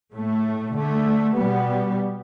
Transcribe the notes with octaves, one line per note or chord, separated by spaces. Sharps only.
A2 A3
D3 A3
B2 G3 B3